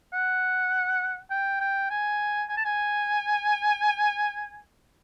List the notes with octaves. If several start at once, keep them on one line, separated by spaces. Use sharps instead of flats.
F#5
G5
G5
G#5
G#5
A5
G#5